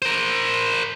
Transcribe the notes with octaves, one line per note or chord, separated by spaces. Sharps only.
A#4 C5